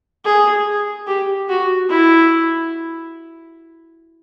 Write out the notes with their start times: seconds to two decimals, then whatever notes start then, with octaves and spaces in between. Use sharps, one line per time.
0.25 G#4
1.07 G4
1.49 F#4
1.89 E4